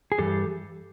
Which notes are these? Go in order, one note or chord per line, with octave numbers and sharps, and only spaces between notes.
G#4
G2 E3 G3 G4 A4